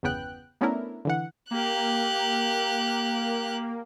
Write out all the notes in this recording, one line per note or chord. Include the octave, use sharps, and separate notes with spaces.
G1 E2 C#3 B3 G5 F#6
A3 B3 C#4 D4 E4 A#4
D3 E3 F#5
A#3 G4 F#6